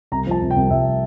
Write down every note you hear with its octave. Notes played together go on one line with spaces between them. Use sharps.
C2 A#5
F3 A5
C2
G5
C2
C2 E5